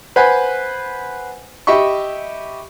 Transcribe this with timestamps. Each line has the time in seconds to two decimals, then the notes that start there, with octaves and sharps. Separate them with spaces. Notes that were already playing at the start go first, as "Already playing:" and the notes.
0.16 B4 C5 F#5 G#5 B5
1.67 G4 D#5 E5 B5 C#6